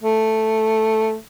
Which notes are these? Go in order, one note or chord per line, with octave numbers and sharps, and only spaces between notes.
A3